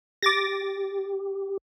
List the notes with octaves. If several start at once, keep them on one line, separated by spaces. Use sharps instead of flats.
G4 D6 A6 A#6